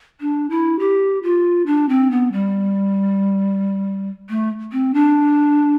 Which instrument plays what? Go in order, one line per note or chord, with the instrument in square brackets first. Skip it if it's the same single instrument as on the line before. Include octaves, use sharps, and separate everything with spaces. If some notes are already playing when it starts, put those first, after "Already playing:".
[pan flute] D4
E4
G4
F4
D4
C4
B3
G3
A3
C4
D4